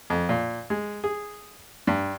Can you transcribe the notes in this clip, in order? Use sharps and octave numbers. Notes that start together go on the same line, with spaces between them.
F2
A#2
G#3
G#4
G2